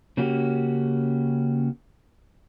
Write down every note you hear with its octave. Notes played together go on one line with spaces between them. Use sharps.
C#3 A#3 C#4 F#4 G4